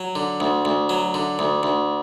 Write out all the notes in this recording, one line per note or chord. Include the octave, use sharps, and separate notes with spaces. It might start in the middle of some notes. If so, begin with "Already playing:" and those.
Already playing: F#3
D3
D2
D2
F#3
D3
D2
D2